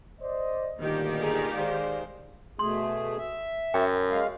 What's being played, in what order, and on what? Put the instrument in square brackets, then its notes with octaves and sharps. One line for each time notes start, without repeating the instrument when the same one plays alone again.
[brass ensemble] C5 D5 D#5
[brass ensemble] D2 G2 A#2 [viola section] D#3 G4
[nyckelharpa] G#4 A#5
[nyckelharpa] G#3 C5 [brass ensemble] D5 F5
[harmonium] B2 A3 G#4 [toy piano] C6
[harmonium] E5
[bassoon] F#2 [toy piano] G5
[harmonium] G#3 F5